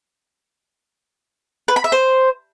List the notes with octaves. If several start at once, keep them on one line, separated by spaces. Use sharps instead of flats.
B4
B5
E5
C5